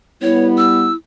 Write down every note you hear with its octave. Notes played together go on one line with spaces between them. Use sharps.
G3 B3 E4 C#5
E6